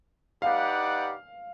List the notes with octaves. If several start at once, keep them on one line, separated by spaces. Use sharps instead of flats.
D#4 G4 B4 D5 F5 F#5